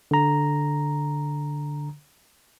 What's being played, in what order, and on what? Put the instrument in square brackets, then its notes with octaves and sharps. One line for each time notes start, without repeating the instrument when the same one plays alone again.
[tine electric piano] D3 A#5